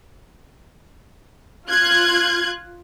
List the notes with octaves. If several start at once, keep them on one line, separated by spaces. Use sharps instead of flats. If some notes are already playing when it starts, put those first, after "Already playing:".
F4 F#6 G#6